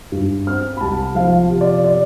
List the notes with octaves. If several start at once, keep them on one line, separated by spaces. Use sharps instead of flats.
G2
C4 F6
B5
C2 A5
F3 F5
C3
D5
D5